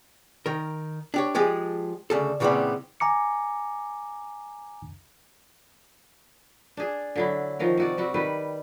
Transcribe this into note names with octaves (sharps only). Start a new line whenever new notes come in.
D#3 A#4
D4 G4 C#5
F3 G#3 G4 G#4
D2 C#3 A4
A#2 C#3 E3 G3 B3 C4
G#5 A#5 D6 C#7
D4 G#4
D3 F#3 E4
D#3 F3 F#4 A#4
C3 F#4 D5
G3 C4 F#4
D#3 G3 B4